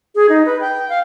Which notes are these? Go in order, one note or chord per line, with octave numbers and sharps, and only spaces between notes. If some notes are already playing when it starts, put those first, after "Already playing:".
G#4
D#4
B4
G5
F5